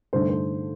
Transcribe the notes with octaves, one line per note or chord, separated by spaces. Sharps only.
G2 D3 A3 D#4 C5
C5